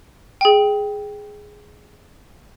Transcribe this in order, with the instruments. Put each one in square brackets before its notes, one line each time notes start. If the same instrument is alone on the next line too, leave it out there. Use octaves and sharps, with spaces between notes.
[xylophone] G#4 G5